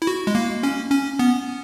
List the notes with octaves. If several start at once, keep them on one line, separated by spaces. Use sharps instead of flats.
E4
F#4
G#3
A#3
C#4
C#4
B3